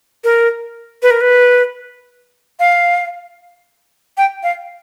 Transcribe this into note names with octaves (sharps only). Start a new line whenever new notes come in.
A#4
B4
A#4
B4
F5
G5
F5